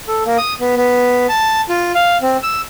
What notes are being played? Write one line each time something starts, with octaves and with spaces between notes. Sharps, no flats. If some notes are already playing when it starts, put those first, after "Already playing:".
A4
A#3
D#6
B3
B3
A5
F4
F5
C4
E6